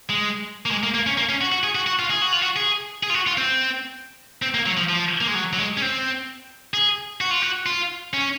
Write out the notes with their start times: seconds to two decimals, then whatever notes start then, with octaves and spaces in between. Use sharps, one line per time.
0.09 G#3
0.66 A#3
0.71 G#3
0.83 A#3
0.94 A#3
1.07 C#4
1.18 A#3
1.29 C#4
1.41 F#4
1.52 F#4
1.63 G#4
1.75 F#4
1.87 F#4
1.99 F4
2.10 G#4
2.22 F#4
2.32 F4
2.42 F#4
2.56 G#4
3.03 G#4
3.10 F4
3.14 F#4
3.27 F4
3.37 C4
4.42 C4
4.54 A#3
4.66 F#3
4.77 F3
4.89 F3
5.21 A#3
5.27 G#3
5.35 F#3
5.53 F#3
5.58 G#3
5.77 C#4
5.82 C4
6.74 G#4
7.21 F#4
7.31 F4
7.42 F#4
7.66 F4
8.14 C#4